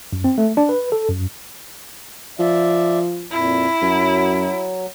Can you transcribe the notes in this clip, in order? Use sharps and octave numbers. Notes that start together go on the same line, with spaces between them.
F#2
C4
A3
D4
B4
A4
F#2
F3 D5 E5
F2 A#2 E4
F#2 F#3